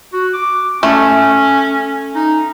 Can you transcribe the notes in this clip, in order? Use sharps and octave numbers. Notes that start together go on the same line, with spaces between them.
F#4
D6
A3 C#4
D#4